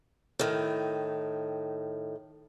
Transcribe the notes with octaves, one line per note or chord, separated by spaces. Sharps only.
A2 D#3